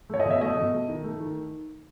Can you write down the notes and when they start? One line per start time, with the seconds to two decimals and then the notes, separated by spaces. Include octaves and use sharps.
0.10 A3 C#5
0.20 D#5
0.25 B2
0.31 E5
0.41 A3 D#5
0.57 B2
0.72 A3
0.88 D#3
1.04 A3
1.20 D#3